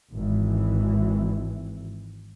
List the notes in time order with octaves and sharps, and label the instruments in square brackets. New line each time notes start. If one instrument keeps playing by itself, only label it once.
[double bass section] G#1 E3